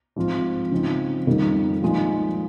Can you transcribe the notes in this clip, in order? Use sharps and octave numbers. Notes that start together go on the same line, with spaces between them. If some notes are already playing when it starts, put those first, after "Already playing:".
G#2 F3 C4 F4
C#3 F3 C4 D#4
F2 D#3 G3 A#3 D#4
A#2 F3 G#3 D#4